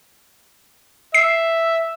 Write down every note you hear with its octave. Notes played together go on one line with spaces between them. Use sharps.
E5 C7